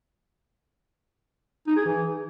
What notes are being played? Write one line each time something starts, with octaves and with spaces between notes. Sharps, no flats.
D#4
G#4
E3